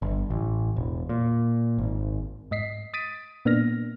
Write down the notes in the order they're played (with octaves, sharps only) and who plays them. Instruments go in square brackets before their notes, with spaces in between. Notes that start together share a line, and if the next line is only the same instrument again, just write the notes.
[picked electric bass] G1
A1
E1
A#2
G#1
[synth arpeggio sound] G#2 D#5 B6 C7
D#6 A6 B6 D7 D#7
A#2 A#3 B3 D4 F6 A#6